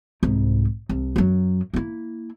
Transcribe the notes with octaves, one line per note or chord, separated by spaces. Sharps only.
C2 G#2
C2
F#2 F#3
A#3 E4